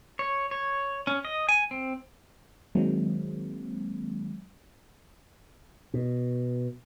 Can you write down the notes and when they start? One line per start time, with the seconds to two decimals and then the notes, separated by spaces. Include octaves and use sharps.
0.19 C#5
0.51 C#5
1.07 C#4
1.25 D#5
1.49 G#5
1.71 C4
2.75 D#3 F#3 G#3 A#3 C4
5.94 B2